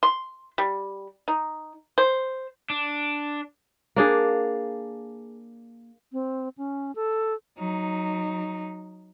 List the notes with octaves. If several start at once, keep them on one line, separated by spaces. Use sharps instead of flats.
C6
G3
D#4
C5
D4
A#3 D4 G#4
C4
C#4
A4
F#3 D#4